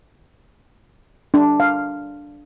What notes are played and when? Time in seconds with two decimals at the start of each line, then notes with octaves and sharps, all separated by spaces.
1.34 D4
1.60 F5